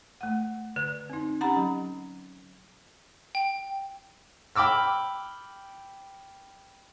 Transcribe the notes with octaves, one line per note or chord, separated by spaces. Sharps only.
A3 F#5
D3 B4
C4 D#4
C#4 G4 F#5 A#5 B5
F#3
G5
G5 B5 D6 E6 F6